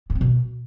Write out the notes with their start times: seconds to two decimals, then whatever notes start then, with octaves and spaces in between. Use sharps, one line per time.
0.10 B3
0.15 C4
0.21 B2